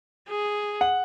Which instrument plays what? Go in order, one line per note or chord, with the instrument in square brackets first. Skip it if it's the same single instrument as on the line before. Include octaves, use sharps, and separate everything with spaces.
[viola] G#4
[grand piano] F#5